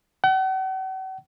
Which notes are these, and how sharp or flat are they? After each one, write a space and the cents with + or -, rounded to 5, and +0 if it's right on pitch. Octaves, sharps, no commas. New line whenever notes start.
F#5 +45